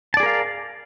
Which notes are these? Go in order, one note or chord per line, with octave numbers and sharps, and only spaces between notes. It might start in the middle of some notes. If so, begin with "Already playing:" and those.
G#4 A#4 D5 F5 A5